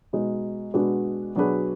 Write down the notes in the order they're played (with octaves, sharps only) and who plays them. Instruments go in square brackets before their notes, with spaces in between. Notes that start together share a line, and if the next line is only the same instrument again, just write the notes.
[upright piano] B2 G#3 D#4
B2 G#3 D4 F#4 B4
B2 F#3 D4 G#4 B4